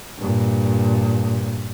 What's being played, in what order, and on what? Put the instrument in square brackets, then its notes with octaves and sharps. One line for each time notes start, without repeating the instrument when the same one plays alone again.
[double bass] G2 A#2